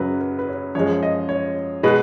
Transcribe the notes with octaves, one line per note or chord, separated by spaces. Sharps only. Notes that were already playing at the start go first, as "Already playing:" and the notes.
Already playing: F#2 C#3 F#3 B4
B4
B4
C#5
F#2 F3 G#3 C#5
D#5
C#5
B2 G#3 B4